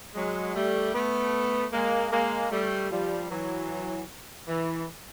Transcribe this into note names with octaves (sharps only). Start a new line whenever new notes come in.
F#3 G#3
G3 A3
A3 B3
G#3 A#3
G#3 A#3
G3 A3
F3 G3
E3 F#3
E3